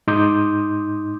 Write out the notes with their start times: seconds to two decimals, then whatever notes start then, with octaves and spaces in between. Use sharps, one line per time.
0.07 G#2 D#4 C6 D6 D#6 G6